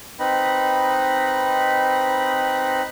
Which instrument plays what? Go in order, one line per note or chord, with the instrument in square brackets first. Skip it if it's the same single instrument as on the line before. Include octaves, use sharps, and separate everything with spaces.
[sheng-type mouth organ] C4 D#4 B4 D#5 B5